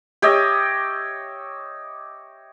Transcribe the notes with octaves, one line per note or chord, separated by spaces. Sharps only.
G4 C#5 D#5 E5